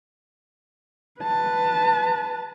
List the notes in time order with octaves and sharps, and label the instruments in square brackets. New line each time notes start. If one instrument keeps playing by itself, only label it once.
[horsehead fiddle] B4 A5